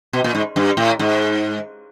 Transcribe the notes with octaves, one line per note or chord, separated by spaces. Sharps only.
B2
A#2
G#2
G2
A2
G#2